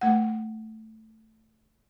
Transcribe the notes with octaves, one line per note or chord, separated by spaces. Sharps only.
A3 F#5